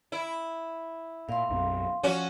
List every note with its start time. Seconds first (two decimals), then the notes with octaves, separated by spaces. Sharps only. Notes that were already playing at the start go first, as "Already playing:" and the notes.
0.12 E4
1.29 A#2 F5 C6
1.50 B1 F#2 C4
2.03 F3 C#4 F#4